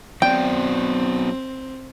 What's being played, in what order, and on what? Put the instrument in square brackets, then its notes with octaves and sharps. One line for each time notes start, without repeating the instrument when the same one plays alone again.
[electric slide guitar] F#3 B3 D5 [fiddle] C4 [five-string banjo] G5